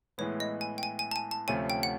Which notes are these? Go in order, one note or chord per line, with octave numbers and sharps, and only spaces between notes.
A2 E3 G#3 B3 C#5
D#5
G#5
G5
G#5
G#5
A5
G#5
A5
D2 C3 F3 A3 C#4 G#5
G5
F#5